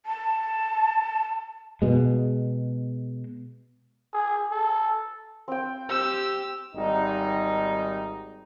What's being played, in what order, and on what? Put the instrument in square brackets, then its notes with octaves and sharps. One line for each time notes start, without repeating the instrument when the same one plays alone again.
[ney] A5
[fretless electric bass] B2 G#3
[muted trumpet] G#4
A4
[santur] C4 G5
[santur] C4 [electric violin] G4 E6
[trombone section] G#1 G3 D#4